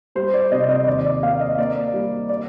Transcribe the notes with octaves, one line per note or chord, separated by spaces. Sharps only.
G3 C5
D5
C3 D#5
D#5
D#5
D#2 D5
D5
A#3 F5
D#5
A#3 D5
G3
D5